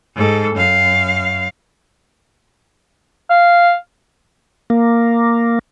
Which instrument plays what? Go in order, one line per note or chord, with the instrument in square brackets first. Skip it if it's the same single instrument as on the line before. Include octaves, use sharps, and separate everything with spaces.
[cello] G#2 A4
F#2 F5
[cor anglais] F5
[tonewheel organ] A#3